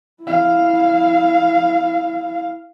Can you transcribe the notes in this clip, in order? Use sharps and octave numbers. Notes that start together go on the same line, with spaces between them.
E4 F5